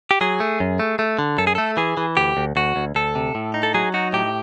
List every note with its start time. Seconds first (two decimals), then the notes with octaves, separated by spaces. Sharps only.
0.11 G4
0.21 F#3 G#4
0.40 A3
0.60 F#2
0.79 A3
0.99 A3
1.19 D3
1.38 F#2 A4
1.47 G#4
1.55 A3 A4
1.77 E3 G#4
1.97 E3
2.17 D2 G4
2.37 D2
2.56 D2 F#4
2.76 D2
2.95 D2 A4
3.15 C3
3.35 A2
3.54 D#4
3.63 A4
3.74 F#3 G#4
3.94 D#4 F#4
4.13 A2 G4